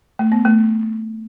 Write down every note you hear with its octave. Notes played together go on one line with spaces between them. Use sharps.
A3
B3
A3